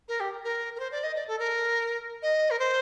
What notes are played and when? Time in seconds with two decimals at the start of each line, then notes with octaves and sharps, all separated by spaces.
0.08 A#4
0.20 G4
0.44 A#4
0.76 A#4
0.79 C5
0.92 D5
1.03 D#5
1.15 D5
1.28 A4
1.39 A#4
2.22 D#5
2.50 A#4
2.59 C5